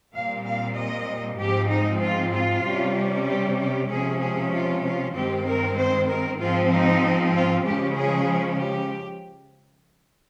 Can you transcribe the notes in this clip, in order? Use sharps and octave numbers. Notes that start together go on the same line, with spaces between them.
A#2 G3 C4 F5
F5
D#5
G#2 F3 C4 G4
D#4
F4
F4
C3 G3 C#4
G4
G4
C3 F3 G#3 C#4 G#4
G#4
F4
F4
G2 D#3 G#3 C4 G4
A#4
C5
A#4
G#2 F3 C4 F4
D#4
F4
C#3 F3 G#3 C#4 G4
G#4
G4